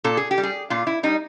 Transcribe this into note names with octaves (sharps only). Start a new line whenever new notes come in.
A#2 A4
G#4
G4
G3
G#4
A#2 F4
E4
G3 D#4